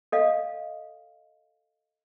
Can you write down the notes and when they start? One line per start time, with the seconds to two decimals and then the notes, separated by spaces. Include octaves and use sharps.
0.12 A4 D#5 F5